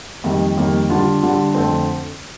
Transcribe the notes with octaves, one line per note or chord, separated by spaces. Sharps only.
F2 D#3 G3 A#3
F2 D#3 G3 A#3
D3 G3 D4 F4
D3 G3 D4 F4
F2 D3 A3 C4